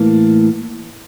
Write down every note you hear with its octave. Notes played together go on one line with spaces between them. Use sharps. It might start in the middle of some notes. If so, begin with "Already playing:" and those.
Already playing: A2 E3 A#3